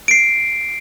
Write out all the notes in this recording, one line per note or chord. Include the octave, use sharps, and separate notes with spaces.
C7 D7